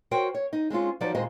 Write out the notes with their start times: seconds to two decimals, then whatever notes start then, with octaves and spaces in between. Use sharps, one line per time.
0.11 F#4 A#4 C5 C#5 G5
0.34 C#5
0.53 D#4
0.70 G#3 C4 C#4 F4
1.01 F3 F#3 D#4 F#4 B4 D5
1.15 D#2 A#2 G#3 C4 C5 D#5